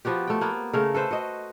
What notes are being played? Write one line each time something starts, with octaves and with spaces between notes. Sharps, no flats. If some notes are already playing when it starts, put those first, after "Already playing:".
F3 B3 F#4 G4
A3 G5
A#3 B3
C#3 A3 A#4
A4 B4 C5 E5
F#4 D#5